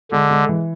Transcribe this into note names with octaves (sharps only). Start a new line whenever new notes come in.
D3 G#3
G#3
E3